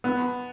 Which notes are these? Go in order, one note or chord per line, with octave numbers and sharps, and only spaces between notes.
B3